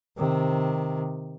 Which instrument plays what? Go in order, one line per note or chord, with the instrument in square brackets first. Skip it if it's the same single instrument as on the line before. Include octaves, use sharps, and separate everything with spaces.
[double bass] C3 D#3